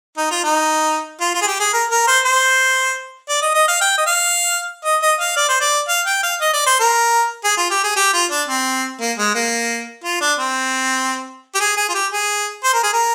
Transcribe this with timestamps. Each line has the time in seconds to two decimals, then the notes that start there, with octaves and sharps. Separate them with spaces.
0.17 D#4
0.31 F4
0.44 D#4
1.21 F4
1.34 F4
1.42 G#4
1.47 G4
1.60 G#4
1.73 A#4
1.90 A#4
2.08 C5
2.25 C5
3.29 D5
3.42 D#5
3.55 D#5
3.68 F5
3.81 G5
3.98 D#5
4.07 F5
4.84 D#5
5.02 D#5
5.20 F5
5.36 D5
5.49 C5
5.60 D5
5.89 F5
6.06 G5
6.23 F5
6.41 D#5
6.53 D5
6.66 C5
6.80 A#4
7.44 G#4
7.57 F4
7.70 G4
7.84 G#4
7.96 G4
8.14 F4
8.31 D4
8.48 C4
9.01 A#3
9.18 G#3
9.35 A#3
10.04 F4
10.21 D4
10.39 C4
11.55 G4
11.60 G#4
11.77 G#4
11.89 F4
11.95 G4
12.12 G#4
12.64 C5
12.74 A#4
12.83 G#4
12.93 A#4